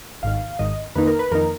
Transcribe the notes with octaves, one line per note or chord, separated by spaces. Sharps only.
G#1 G#2 D#3 F5
G#1 G#2 D#3 D#5
F2 D#3 A#3 D#4 B4
A#4
B4
F2 D#3 A#3 D#4 A#4